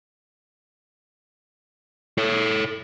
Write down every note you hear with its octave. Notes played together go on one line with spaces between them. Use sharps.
A4 C#5